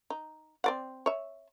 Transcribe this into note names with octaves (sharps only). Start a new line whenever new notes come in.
D#4
C4 D5 F#5
C#5 E5